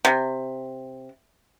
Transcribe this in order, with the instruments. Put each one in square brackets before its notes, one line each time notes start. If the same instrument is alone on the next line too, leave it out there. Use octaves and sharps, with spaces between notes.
[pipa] C3